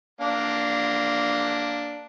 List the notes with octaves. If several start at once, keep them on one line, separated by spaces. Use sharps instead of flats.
A#3 D4